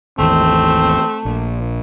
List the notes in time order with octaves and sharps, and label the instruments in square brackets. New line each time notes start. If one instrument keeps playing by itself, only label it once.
[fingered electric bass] G#1 D#2 E3 [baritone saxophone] A3 [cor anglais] C4
[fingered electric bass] A#1